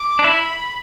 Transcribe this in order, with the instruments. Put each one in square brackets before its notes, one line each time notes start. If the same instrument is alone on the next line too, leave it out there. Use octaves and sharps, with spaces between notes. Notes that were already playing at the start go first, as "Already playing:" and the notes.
Already playing: [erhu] D6
[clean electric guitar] D4
[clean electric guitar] E4 [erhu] B5